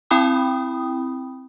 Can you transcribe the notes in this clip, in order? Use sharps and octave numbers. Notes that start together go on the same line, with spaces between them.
C4 E4 G5 B5 D#6